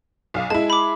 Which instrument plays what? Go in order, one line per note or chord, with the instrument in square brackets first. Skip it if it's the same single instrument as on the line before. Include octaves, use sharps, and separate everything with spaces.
[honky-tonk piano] B1 F5
[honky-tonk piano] G#3 E4 [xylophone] A5
[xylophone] B5 D6